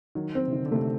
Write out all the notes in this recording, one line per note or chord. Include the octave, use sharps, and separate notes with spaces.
D#3 F#3
C4
C3
D3 D#3
D3
C3 A3